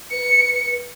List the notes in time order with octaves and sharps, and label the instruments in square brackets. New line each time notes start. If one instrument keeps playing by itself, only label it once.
[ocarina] B4 [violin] C#7